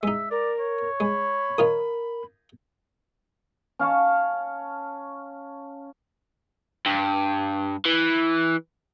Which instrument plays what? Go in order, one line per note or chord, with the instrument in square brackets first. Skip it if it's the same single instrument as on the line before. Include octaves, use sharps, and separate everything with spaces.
[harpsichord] G#3 D#4 [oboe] E5
[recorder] A#4 [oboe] D5
[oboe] C#5
[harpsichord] G#3 [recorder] B5
[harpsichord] D#3 F4 D#6 [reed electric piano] A#4
[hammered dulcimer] C#4 F5 A5 C#6
[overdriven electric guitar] G2
E3